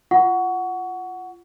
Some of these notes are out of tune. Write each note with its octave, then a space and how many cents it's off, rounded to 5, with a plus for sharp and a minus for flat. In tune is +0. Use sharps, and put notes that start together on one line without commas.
F4 -20 F#5 +0 C#6 +20